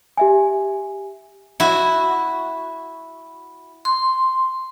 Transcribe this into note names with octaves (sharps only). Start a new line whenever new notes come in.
G4 E5 G#5
E4 F#4
C6